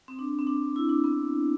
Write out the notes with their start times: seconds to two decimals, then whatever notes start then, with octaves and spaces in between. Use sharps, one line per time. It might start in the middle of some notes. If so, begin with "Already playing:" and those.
0.08 C4
0.19 D4
0.39 C4
0.47 D4
0.76 E4
0.89 D4
1.04 B3